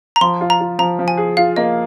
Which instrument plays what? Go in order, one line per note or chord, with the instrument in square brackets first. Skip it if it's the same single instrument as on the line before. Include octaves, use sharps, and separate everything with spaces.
[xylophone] A#5
[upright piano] F3 [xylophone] C6
[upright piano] F4
[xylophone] A#5
[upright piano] F4
[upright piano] F3 [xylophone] A#5
[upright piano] F3
[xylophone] G#5
[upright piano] G#4
[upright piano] F4 [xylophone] F5
[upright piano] A#3 [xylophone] D#5